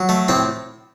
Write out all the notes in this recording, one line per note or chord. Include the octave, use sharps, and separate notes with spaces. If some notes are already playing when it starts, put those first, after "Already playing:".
Already playing: F#3
A3
A2 C4